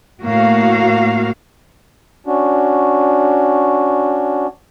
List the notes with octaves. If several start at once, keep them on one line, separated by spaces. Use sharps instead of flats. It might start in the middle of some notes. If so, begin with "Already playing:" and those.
A2 A#3 F#4 F5
C#4 D4 F#4